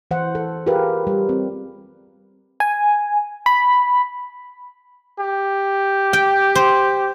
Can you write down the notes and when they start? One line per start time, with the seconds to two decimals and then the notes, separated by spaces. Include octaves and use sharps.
0.11 E3 C5 F#5
0.35 A4
0.66 F4 G4 G#4 A#4 B4 F5
1.07 G3
1.29 C4
2.60 G#5
3.46 B5
5.19 G4
6.13 G5
6.55 C5